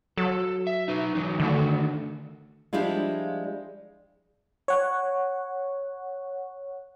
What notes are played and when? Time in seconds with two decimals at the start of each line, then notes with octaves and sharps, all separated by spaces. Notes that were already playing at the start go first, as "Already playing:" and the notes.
0.18 F#3 A4
0.67 E5
0.88 D#4 B4
1.15 E3 F#3 D#4
1.40 D3 D#3 A3 F#4
2.73 F3 G3 G#3 D4 E4 F4
4.68 C#5 F#5